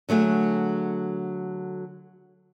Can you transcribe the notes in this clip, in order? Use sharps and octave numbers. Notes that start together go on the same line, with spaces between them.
D3 F#3 A3 G#4